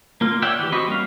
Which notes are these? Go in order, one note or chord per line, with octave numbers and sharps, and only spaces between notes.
A#3 F4
C#5 D5 E5 F#5 G5
E3 G4
C4 F#4 D#5 B5
G3 A#3 C#4 F#4 F5